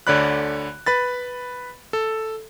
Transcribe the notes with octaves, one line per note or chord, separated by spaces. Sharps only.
D2 D3 C#5 D5 B5 F#6
B4 B5 A6
A4